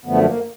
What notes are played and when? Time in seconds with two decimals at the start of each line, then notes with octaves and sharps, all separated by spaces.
0.05 F#2 D3 F3 A3 B3
0.25 A#3